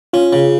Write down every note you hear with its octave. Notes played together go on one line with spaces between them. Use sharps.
C#4 F4
C#3